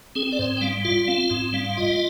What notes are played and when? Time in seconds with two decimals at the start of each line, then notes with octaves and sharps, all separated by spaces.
0.15 C4 G#4
0.32 D5
0.39 G#2 C5
0.57 G5
0.61 G3 F5
0.85 F4 F5
1.08 C4 F5
1.30 G#2 F5
1.53 G3 F5
1.64 F5
1.77 F4 D#5